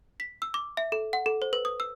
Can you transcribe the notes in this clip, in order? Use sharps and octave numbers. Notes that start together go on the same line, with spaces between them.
B6
E6
D6
E5
A4
F#5
A4
C5
B4
D#6
E6